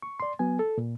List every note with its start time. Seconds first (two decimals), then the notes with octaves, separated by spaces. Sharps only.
0.02 C#6
0.20 D5 C6
0.39 F#3 B3 G#5
0.59 A4
0.78 A#2